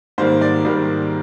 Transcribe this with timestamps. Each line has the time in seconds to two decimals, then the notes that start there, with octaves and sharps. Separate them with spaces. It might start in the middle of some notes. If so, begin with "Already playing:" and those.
0.18 G#2 D#3 G3 A#3 C5
0.41 D5
0.65 G#2 D#3 G3 A#3